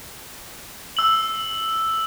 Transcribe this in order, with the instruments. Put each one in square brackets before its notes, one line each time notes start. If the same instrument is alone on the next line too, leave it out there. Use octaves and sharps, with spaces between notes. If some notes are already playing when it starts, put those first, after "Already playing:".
[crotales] E6 F#7